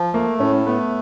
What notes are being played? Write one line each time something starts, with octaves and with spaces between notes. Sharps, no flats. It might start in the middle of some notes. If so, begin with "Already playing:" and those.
Already playing: F3
A3 A#3
A2 C#4
A3 B3